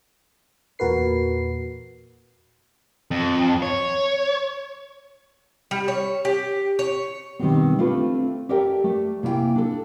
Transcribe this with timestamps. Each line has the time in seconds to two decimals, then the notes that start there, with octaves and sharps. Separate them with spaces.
0.79 E2 A#2 F#4 A#4 B4 C7
3.11 F2
3.62 C#5
5.71 G3
5.88 C#5
6.25 G4
6.79 C#5
7.39 B2 D#3 G3 A3 B3 C4
7.79 A3 C4 D4 F4 A4 B4
8.49 G4 A4 A#4 D5 E5 G5
8.84 A3
9.23 C3 A#3 E4 E5 G5 G#5
9.55 D4 A4